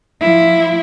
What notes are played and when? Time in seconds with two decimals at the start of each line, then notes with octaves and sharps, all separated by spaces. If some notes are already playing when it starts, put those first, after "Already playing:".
0.21 F3 E4